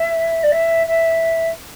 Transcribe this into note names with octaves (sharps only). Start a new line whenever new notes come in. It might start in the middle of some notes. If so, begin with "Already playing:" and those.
Already playing: E5
D5
E5
E5